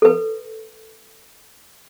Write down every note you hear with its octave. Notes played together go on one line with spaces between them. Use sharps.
A4 B4